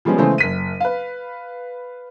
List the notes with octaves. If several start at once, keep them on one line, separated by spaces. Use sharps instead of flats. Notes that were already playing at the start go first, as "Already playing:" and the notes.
F3 G3 G#3 B3 C#4
C#3 E3 G#3 A3 A4 C5
F#1 B6 D#7
B4 F5